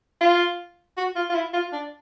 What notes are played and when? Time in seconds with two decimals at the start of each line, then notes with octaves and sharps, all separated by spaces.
0.21 F4
0.97 F#4
1.16 F4
1.30 F4
1.35 E4
1.53 F4
1.73 D4